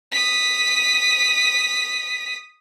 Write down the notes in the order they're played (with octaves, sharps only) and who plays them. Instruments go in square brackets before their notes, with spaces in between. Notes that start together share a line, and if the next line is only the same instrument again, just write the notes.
[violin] D#6 B6